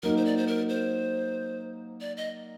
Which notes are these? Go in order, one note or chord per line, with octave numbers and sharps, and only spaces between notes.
F#3 A#3 D#4 A#4
C5
D5
C5
A#4
C5
D5
D#5